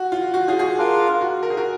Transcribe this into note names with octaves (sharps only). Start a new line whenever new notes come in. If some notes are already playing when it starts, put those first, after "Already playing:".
Already playing: F#4
F4
F#4
F4 G#4
G#4
F#4
D4 F4 A#4 F5
F#4
A#4
G#4
F#4 A#4